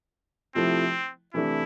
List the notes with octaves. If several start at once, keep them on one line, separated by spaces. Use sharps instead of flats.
C3 F3 A3 C4 E4
C3 E3 A3 D4 E4